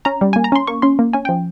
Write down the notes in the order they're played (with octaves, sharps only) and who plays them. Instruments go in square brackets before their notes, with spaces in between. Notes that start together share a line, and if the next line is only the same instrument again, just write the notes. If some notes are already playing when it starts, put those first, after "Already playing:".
[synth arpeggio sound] C#4 A#5
G3
A#3 G#5
A#5
C#4 C6
A#3 C#6
C#4 C6
A#3
C#4 G#5
F3 G5